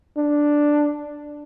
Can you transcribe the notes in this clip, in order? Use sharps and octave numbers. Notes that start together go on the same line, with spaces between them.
D4